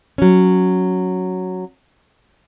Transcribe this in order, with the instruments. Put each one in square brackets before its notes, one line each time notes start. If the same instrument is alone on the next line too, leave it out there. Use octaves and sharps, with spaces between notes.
[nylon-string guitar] F#3 C#4